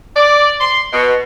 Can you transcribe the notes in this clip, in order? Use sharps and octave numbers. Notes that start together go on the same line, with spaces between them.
D5
C6
B2